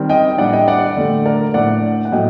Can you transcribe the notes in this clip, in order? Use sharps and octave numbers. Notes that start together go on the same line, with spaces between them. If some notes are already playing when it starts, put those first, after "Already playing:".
Already playing: D#3 G3 C4
D#5 G5
A2 G3 D4 D5 F#5
D#5 G5
D5 F#5
D3 A3 D4
A#4 D5
A2 A3 D4 D5 F#5
F#5
A2 F#3 A3 D#5 G5